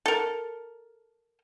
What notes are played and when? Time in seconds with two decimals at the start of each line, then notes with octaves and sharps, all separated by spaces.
0.06 A4 A#4